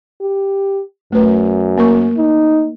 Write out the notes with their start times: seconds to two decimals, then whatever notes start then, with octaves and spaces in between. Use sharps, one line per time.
0.21 G4
1.12 F#2 A3 B4
1.78 A#3 A#4 C#6
2.17 D#4